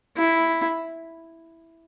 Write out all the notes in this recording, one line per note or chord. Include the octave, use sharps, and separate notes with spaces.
E4